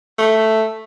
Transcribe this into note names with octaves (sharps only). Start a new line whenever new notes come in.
A3